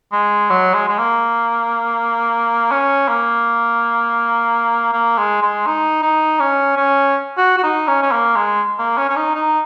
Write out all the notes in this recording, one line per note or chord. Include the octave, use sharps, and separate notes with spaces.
G#3
F#3
G#3
G#3
A#3
C#4
A#3
A#3
G#3
G#3
D#4
D#4
C#4
C#4
F#4
F#4
D#4
C#4
C#4
A#3
G#3
A#3
C#4
C#4
D#4
D#4